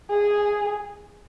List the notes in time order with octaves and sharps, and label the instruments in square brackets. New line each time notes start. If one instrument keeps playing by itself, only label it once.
[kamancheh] G#4